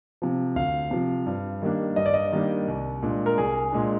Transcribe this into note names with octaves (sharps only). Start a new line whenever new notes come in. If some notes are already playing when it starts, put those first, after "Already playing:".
C3 F3
D2 F5
C3 F3
G2
D#3 G3 A#3 D4
G2 D#5
D5
D#5
D#3 G3 A#3 D4
C2
A#2 G#3 D4
A#4
C2 G#4
A#2 G#3 D4